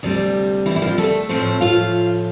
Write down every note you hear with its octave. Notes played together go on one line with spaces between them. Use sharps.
D2 C3 G3
E3 E4
E4
F3 F4
A3 A4
A2 F3 A3 C4 C5
F4 F5